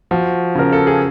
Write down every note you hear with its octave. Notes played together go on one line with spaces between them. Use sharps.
F3 F#4
C#3 A#4
A4
G#4